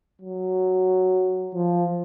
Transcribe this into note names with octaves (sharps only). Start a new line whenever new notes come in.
F#3
F3